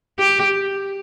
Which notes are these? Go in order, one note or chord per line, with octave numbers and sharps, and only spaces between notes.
G4